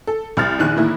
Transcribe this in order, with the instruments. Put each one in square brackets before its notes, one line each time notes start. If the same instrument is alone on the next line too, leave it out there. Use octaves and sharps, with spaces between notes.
[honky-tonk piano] A4
C2 F6 A6
A#1 E2 D#3 F#6
A2 D#3 E3 A#3 E4